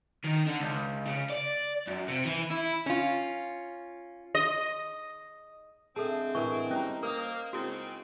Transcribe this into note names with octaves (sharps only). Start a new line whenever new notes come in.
D#3
D3
C#2
C#3
D5
F#2
C3
E3
E4
C#4 F4
D#5
D3 G#3 C4 G#4 A4 E5 A5
A2 E3 A#4 C#6
G3 C#4 D#5 G#5 A#5
A#3 A#4 C5 D#6
G#2 C#3 C4 E4 F#4